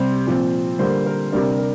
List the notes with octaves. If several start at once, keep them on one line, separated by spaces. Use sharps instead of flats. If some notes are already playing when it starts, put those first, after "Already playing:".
Already playing: C3 G3 C4 C5
A#2 F3 C4
D3 G3 A#3 C5
A#4
C3 G3 D4 A#4
A#4